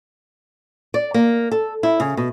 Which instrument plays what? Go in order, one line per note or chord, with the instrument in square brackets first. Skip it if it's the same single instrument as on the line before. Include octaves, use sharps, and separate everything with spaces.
[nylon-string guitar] D5
A#3
A4
E4
C#3
B2